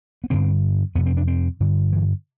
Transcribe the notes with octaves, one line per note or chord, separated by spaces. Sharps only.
B3
G2 D3 C4
F2 C3 B3
C4
D4
C4
G2 D3
E3